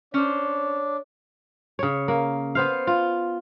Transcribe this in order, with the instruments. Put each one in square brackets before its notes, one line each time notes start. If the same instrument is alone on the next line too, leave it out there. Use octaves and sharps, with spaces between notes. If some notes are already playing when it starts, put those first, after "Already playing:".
[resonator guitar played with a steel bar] C#4 C5 [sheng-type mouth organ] D4 [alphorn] C#5
[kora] C#3 C#5
A#3
B3 C5 F5
F4